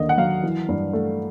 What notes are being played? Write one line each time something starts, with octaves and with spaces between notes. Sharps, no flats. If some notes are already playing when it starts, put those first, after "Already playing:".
Already playing: D#2 D3 D#5
F#5
F#3 F5
E3
G2
A3